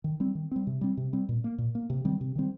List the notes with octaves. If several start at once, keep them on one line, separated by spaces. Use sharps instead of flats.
D#3
G3 C4
D#3
G3 C4
C3
G3 C4
C3
G3 C4
A#2
A#3
A#2
A#3
C3
D#3 G3 C4
C3
D#3 G3 C4